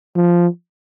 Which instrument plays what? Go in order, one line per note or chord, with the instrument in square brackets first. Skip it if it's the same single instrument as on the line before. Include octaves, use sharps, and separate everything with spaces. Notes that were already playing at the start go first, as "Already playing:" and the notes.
[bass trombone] F3